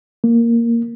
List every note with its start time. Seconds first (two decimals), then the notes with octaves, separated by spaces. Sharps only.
0.24 A#3